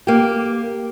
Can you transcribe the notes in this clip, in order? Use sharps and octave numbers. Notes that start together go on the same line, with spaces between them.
A#3 G4